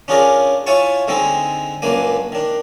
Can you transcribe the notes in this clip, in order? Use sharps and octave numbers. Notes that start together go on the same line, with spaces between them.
C#4 D4 F4 G#4 A#4 D5
E4 F4 C#5 G#5 A5 C#6
D3 G#3 C4 D#4 G#4 A4
C#2 F#2 A#3 D4 G#5
D#3 D4